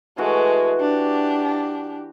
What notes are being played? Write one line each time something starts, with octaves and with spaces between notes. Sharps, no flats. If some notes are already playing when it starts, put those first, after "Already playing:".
E3 G#3 A3 F#4
D4 G4